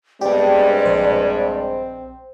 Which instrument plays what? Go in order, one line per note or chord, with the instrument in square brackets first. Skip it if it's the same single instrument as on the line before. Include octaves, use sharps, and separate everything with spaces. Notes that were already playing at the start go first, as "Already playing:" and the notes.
[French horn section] G2 G#3 [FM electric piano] B3 G4 [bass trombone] C4 [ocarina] D5
[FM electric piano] A#1 C5